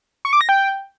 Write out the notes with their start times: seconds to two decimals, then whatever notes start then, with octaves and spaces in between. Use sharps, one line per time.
0.25 C#6
0.33 D6
0.41 A#6
0.49 G5